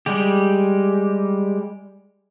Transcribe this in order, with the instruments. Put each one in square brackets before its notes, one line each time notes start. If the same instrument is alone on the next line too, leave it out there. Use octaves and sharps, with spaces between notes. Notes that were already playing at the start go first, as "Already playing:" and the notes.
[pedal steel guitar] G3 G#3 G4